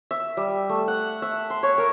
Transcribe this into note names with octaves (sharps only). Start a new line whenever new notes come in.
E5
G3
A3
F#5
E5
C6
C#5
A#4